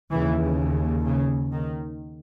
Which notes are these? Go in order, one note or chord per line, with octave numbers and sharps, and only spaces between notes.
D#2 C#3 E3
C#3
D#3